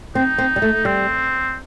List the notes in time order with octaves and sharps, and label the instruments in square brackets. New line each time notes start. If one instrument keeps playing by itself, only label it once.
[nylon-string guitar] C4 [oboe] D#4
[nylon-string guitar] C4
G3
A3
[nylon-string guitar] G3 [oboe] C4